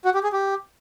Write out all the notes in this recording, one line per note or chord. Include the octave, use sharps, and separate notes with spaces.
F#4
G4
G#4
G4